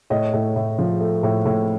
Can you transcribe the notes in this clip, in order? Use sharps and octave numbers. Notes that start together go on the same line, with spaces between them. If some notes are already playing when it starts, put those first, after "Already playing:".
A2 C#5 D#5
A2
A2
F3
A3
A2
A2